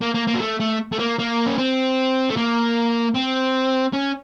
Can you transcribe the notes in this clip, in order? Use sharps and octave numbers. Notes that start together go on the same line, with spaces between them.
A#3
A#3
A#3
F#3
A3
A3
A3
A#3
A#3
C#4
C4
A3
A#3
C4
C#4